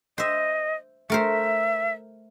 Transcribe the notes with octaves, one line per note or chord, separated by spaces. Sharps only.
C5 D#5 E5
A3 A#4 C5 E5